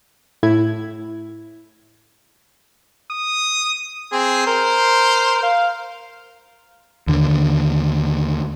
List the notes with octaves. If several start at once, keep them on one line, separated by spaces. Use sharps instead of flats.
A2 E4 G#6
D#6
C4 G#4
A#4 C5
F5
D#2 D3